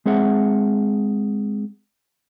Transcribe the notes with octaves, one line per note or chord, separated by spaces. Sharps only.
G#3 C4 G#4 E5 F#5